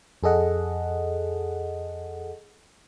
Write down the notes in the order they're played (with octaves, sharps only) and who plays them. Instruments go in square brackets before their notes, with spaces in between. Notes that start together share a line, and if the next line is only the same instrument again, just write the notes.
[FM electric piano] F2 G#4 A4 D#5 F#5